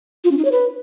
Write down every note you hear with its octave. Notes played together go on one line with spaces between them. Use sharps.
F4
C#4
D#4
C#5
B4